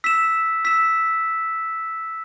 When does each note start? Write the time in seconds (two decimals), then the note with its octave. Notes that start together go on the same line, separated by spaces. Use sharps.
0.04 E6 B6 E7
0.65 E6 B6 E7